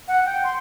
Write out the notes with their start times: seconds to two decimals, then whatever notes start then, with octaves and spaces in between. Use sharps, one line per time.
0.08 F#5
0.26 G5
0.44 C6